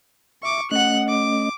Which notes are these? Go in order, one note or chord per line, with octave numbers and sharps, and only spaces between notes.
E5 C#6 D6
A3 C#4 D#5 F#5 F#6
D6